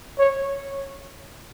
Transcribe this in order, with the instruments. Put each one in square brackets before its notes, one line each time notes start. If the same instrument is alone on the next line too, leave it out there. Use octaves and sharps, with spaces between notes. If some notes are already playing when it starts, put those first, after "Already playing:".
[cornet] C#5